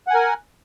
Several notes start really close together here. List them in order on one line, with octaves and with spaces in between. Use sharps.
F#5 G#5 A#4